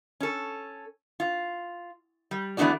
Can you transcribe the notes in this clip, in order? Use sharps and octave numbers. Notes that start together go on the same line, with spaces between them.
C#4 A4
F4
G3
E3 A3 B3 D4 F#4 D5